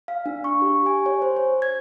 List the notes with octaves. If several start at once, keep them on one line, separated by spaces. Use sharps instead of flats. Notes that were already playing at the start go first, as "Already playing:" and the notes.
F5
D4
C#6
G4
G#5
C#5
C5
C#5
G#6